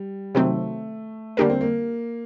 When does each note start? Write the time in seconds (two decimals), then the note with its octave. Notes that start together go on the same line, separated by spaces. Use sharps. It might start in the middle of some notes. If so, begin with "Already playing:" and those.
Already playing: G3
0.35 C3 D#3 F#3 A3 C4
1.37 D3 G3 A#3 D4 G4 A#4
1.50 C4
1.61 A#3